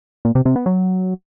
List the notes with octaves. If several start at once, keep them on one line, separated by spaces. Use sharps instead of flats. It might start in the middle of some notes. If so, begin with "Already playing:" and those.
A#2
C3
C3
B3
F#3